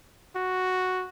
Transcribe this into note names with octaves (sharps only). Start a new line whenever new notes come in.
F#4